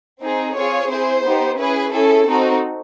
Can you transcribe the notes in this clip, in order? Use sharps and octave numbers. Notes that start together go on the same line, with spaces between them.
C4 D#4 G#4
C4 F4 G#4 C#5
C4 E4 G#4 C5
B3 D#4 G4
C#4 E4 G#4 B4
C#4 E4 G#4 A4
C4 D#4 F#4 A4